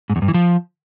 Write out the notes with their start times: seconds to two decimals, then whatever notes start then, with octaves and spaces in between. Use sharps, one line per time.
0.10 G#2
0.16 E2
0.22 G2
0.28 E3
0.34 F3